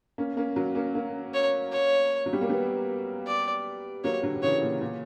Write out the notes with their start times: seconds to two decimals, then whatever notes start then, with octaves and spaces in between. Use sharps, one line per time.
0.18 A#3 C#4
0.37 A#3 C#4
0.56 F#3 A#3
0.75 A#3 C#4
0.95 A#3 C#4
1.34 C#5
1.72 C#5
2.26 F#3
2.33 G3
2.41 A#3
2.49 G3 B3
3.27 D5
4.04 F#3 A#3 C#5
4.23 D3 F#3
4.36 D3
4.43 C#3 E3 C#5
4.62 A#2
4.81 A#2